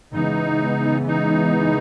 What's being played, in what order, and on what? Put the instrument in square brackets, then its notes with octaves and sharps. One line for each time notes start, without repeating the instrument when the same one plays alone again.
[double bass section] C#3 E3 G#3 B3 [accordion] D#4
[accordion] D#4